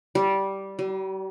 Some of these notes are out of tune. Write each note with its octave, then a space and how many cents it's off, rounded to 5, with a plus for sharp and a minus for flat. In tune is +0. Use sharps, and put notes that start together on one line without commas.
G3 -10
G3 -45